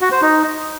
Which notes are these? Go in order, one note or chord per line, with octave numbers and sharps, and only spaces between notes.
F#4
C5
D#4